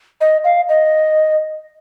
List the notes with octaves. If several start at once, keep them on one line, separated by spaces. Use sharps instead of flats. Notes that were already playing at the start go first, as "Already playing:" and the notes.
D#5
F5
D#5